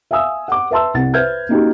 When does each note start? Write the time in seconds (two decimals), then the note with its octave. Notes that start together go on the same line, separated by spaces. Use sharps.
0.11 E5 F5 G#5 D#6 E6
0.48 F#5 D6
0.71 B4 E5 A5 C6 E6
0.94 C2 C3 F#5 A6
1.14 B4 C5 E5 F6 G6 G#6
1.49 A#3 C#4 D#4 F#4 G4